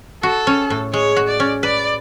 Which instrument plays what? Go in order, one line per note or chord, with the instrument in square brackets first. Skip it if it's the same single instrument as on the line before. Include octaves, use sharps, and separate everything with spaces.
[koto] F#4 [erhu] A4
[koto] C#4
A2
[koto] G#3 [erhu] C#5
[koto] F#4
[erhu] D5
[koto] C#4
[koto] B4 [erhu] D5